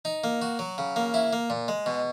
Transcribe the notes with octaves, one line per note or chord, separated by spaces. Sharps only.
D#4
A#3
F#4
F#3
C#3
A#3
E4
A#3
A#2
G#3
B2